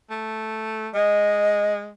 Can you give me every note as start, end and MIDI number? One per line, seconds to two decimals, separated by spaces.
0.10 0.89 57
0.94 1.90 56
0.94 1.74 75